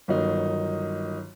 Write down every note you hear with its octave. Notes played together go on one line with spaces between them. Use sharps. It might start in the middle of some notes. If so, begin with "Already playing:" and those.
G1 D#3 F#3 D#4